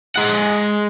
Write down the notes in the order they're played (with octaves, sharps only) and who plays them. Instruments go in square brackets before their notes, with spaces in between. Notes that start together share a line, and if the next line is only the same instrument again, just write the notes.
[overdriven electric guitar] G#3 F#5